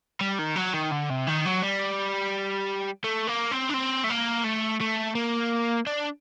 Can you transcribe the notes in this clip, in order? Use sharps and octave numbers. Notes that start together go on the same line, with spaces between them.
G3
D#3
F#3
D#3
D3
C3
D#3
F#3
G3
A3
A#3
C4
D4
C4
A3
A#3
A3
A3
A#3
D4